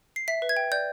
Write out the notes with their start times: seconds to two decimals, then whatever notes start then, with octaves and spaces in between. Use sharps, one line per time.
0.16 C7
0.28 E5 B6
0.42 B4
0.49 G#6
0.57 G5
0.72 D5 G6